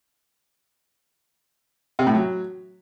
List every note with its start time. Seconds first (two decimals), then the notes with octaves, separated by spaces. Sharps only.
1.99 C3
2.07 A2
2.15 F#3